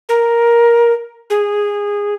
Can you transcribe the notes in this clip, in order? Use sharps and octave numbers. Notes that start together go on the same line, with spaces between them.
A#4
G#4